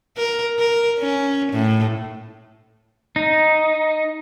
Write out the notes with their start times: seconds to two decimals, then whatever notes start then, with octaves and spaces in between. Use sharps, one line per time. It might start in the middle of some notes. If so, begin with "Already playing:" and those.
0.17 A#4
0.59 A#4
0.99 C#4
1.52 A2
3.16 D#4